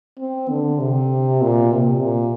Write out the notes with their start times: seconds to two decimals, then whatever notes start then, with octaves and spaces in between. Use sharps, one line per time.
0.20 C4
0.50 D3
0.79 C3
1.41 A#2
1.72 C3
2.02 A#2